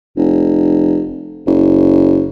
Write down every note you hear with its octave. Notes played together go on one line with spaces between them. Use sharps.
F1
F#1